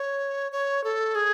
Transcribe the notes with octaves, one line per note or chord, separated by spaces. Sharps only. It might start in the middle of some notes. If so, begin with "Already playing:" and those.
Already playing: C#5
C#5
A4
G#4